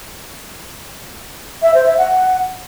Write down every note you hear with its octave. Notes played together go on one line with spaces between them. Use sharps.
E5
C5
E5
F#5